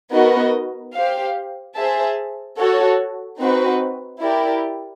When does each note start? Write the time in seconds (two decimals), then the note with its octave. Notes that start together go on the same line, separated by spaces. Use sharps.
0.12 B3 D#4 F#4 A#4 D#5
0.93 G4 C5 F5
1.76 G#4 C5 E5 A5
2.58 F#4 A4 C#5
3.39 C4 D#4 F#4 B4
4.21 E4 G4 A#4 D5